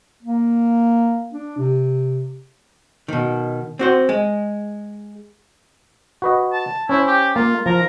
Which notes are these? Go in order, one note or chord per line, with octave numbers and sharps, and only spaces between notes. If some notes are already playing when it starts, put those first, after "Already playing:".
A#3
D4
C3
B2 D#3
C4 F#4 C5
G#3
F#4 B4 D#5
A5
C#4 E4 C5
G4
A#3 F4
F3 A#4